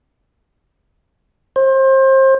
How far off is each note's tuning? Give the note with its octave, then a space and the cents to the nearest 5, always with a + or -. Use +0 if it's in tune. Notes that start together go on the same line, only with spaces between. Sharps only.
C5 +30